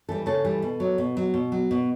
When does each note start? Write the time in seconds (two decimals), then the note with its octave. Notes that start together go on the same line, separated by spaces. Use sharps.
0.09 E3 G3 A4
0.26 C#3 A4
0.44 E3 G3
0.62 B2
0.80 F#3
0.98 B2
1.17 F#3
1.34 B2
1.52 F#3
1.71 B2